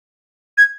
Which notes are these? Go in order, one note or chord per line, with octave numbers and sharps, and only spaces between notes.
G#6